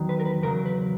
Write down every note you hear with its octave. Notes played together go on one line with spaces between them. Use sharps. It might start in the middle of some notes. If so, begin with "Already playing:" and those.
Already playing: E2 D#3 F#3
B4
A#4
B4
E2 C#3 F#3 A#4
B4